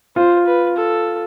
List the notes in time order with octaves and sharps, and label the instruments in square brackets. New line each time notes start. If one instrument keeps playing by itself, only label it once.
[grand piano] F4 [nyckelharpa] C5
[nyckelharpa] B4
A4